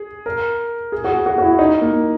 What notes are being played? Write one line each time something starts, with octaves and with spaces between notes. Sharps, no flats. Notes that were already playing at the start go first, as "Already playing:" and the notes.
Already playing: G#4
A#4
G#4
F#4
G#4
F#4
F#4
E4
D#4
A#3